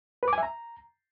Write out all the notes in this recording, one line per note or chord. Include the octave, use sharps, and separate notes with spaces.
B4
D6
G#5
E5
A#5